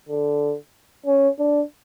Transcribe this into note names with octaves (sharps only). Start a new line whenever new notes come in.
D3
C#4
D4